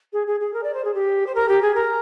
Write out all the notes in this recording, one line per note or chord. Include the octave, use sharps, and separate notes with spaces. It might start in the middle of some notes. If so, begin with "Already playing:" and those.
G#4
G#4
G#4
A#4
D5
C5
G#4
G4
C5
A#4
G4
G#4
A#4